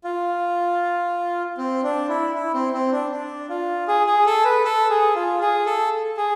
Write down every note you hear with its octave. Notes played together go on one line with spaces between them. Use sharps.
F4
C4
D4
E4
E4
C4
C4
D4
D4
F4
G#4
G#4
A4
B4
A4
G#4
F4
G#4
A4
G#4